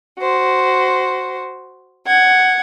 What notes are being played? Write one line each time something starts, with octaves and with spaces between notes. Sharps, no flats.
F#4 C5
F#5 G#6